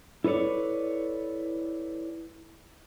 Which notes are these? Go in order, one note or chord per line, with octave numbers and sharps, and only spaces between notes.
E4 A4 B4 C#5 D5